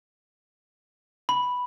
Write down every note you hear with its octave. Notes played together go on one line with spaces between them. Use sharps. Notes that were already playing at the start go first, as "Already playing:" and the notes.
B5